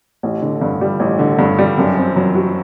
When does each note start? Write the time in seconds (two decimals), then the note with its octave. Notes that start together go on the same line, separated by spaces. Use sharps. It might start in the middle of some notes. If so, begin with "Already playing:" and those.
0.23 A1
0.42 D3
0.61 G2
0.81 G3
1.00 A1
1.19 D3
1.39 G2
1.59 G3
1.78 F#2
1.97 C4
2.16 F#3
2.35 F#4